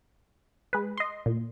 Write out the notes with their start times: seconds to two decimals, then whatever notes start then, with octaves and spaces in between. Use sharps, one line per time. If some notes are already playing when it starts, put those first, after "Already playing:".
0.73 G#3 B4
0.98 D#5 C6
1.26 A#2